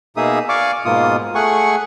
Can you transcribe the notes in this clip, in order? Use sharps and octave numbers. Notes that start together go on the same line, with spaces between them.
B2 A#3 D#4 G#4 E5 D#6
D5 F5 G#5 C#6 D6
G#2 B2 A#3 F4 D#6
A3 G#4 F#5 G#5 C#6